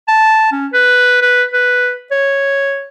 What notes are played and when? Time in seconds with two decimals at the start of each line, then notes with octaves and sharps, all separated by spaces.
0.08 A5
0.53 C#4
0.73 B4
1.22 B4
1.53 B4
2.11 C#5